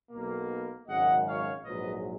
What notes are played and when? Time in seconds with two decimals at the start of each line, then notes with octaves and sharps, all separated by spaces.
0.11 B1 B2 A#3
0.88 G#1 F#2 C#3 G#3 D#5 F#5
1.27 C#5 F5
1.65 A#1 G#2 F#3 B4 D#5